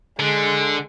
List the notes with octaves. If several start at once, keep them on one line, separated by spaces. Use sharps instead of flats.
D3 G#3